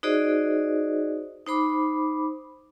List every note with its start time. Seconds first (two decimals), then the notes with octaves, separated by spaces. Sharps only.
0.03 D#4 F#4 G#4 C5 D5 D#5
1.46 D#4 C5 B5 D6